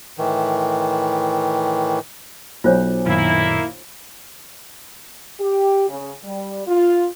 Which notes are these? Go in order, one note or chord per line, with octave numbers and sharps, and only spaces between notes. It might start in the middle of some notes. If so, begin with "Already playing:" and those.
A2 D#3 E3
B1 F4 C5 C#5
F#2 A#2 D#3 A#3 E4
G4
C#3
G3
F4